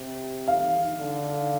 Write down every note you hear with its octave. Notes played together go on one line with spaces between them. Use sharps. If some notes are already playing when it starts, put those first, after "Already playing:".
Already playing: C3
F5
D3